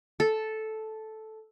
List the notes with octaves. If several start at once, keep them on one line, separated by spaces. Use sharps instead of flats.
A4